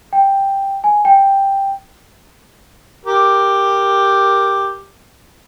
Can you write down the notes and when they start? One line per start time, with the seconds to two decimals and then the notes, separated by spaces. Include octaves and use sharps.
0.13 G5
0.84 G#5
1.05 G5
3.06 G4 A#4